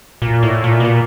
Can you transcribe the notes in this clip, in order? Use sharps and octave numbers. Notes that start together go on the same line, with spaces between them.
A#2
A2
A#2
B2
A#2